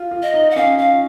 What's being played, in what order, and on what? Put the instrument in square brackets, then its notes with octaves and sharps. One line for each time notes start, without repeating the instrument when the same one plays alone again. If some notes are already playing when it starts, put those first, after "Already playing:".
Already playing: [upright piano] F4
F4
[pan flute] D#5
[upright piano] D#4
[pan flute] F#5
[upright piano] C#4 [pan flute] F5
[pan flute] F5